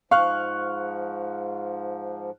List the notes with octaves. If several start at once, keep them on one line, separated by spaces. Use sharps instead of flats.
G#2 F3 F5 C#6 F6 F#6